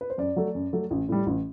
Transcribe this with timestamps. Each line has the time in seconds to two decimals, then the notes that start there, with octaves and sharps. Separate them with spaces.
0.01 B4
0.10 C5
0.18 F#2 D5
0.36 F#3 A3
0.55 F#2
0.73 F#3 A3
0.91 A1
1.09 A2 G3
1.26 A1